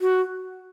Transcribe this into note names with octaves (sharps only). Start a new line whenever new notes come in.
F#4